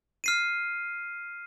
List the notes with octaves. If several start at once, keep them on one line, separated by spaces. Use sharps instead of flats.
F6 C7 D#7